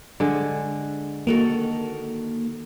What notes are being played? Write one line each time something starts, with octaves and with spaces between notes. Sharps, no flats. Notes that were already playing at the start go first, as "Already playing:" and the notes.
D3 G#3
D#3 A#3 F#4 A4